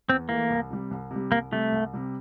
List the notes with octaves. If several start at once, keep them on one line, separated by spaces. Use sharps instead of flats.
E2 C4
E3 A3 A#3
C2
C3 G3
C2
C3 G3
C2 A#3
C3 G3 A3
C2
C3 G3